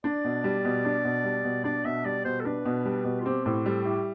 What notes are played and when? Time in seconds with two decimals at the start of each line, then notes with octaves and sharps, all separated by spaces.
0.04 D4 D5
0.24 B2
0.44 G3
0.65 B2
0.85 D4
1.05 B2
1.24 G3
1.44 B2
1.64 D4 D5
1.85 B2 E5
2.05 G3 D5
2.25 B2 C5
2.40 A4
2.45 D4 B4
2.65 B2
2.85 G3
3.04 B2
3.20 F4
3.25 C4 G4
3.45 A2 G4
3.65 G3 A4
3.85 E4 G4